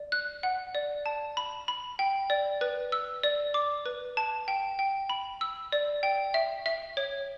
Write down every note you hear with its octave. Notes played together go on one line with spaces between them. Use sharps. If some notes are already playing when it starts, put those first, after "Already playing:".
Already playing: D5
F#6
F#5
D5
A5
B5
B5
G5
D5
B4
E6
D5
D6
B4
A5
G5
G5
B5
E6
D5
G5
E5
E5
C#5